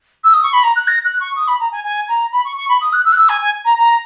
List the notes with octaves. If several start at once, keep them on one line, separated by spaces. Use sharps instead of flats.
E6
D#6
C#6
B5
A#5
F#6
A#6
F#6
C#6
D#6
B5
A#5
G#5
G#5
A#5
B5
C#6
C#6
B5
D#6
F#6
E6
F#6
E6
G#5
G#5
A#5
A#5